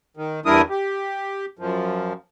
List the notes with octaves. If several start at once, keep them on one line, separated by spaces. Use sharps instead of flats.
D#3
E2 G3 D4 E4 A#4 D#6
G4
F#2 F3